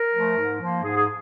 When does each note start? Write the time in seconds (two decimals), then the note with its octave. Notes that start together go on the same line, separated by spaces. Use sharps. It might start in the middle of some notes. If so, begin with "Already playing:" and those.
Already playing: A#4
0.15 F3 A3
0.37 G#2
0.61 F3 A#3
0.83 G#2 G#4
0.96 G#4